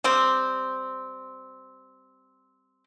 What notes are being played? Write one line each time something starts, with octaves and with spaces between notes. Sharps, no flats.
G3 C4